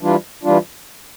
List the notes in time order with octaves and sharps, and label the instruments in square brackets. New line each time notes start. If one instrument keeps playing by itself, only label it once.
[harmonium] E3 G3 D4 F4
E3 G3 D4 F4